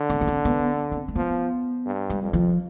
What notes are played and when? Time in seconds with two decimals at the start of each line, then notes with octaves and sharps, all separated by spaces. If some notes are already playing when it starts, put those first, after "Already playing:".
Already playing: D3
0.10 B3
0.21 B3
0.27 C4
0.45 B3
0.92 C4
1.08 A3
1.16 F3 B3
1.86 G2
2.10 G3
2.22 F2
2.33 F3